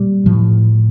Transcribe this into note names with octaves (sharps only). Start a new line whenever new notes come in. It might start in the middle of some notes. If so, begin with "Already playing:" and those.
Already playing: A#2 G3
A2 F3